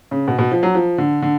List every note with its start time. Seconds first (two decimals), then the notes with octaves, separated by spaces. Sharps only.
0.11 C#3
0.28 B2
0.39 B2
0.51 F3
0.63 F#3
0.75 F3
0.98 D3
1.22 D3